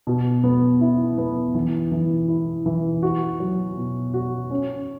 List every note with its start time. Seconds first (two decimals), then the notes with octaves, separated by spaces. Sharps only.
0.07 B2
0.44 B3
0.81 E4
1.18 B3
1.55 E3
1.92 E3
2.28 E4
2.66 E3
3.03 F#4
3.40 F#3
3.77 B2
4.14 F#4
4.51 C#4